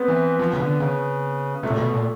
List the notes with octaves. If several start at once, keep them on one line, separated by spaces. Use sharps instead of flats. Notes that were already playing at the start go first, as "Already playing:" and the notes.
Already playing: B3 C4
E3
F3
C#3
D3
C#3
C3 A3
A#2
B2
A#2